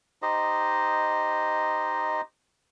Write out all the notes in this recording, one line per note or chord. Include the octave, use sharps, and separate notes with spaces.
D#4 G4 C5 D#5